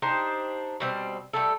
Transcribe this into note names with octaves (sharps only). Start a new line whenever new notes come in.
D4 D#4 G4 C5
B2 G3 C4
G3 A3 A4